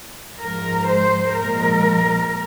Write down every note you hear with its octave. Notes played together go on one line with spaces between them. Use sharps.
G#2 F3 G#3 A#4
C5
A#2 F3 G#3 A#4